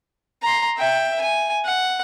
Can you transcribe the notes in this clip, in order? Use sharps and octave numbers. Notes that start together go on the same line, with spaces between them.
A#5 C6
E5 G5
G#5
F#5